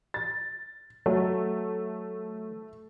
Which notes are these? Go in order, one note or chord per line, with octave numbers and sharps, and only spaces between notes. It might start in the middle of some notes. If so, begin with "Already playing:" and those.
A6
F#3 A3